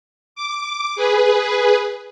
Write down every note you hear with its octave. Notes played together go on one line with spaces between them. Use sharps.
D6
G#4 B4